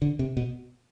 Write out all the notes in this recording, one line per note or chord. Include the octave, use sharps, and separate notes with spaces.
D3
C3
B2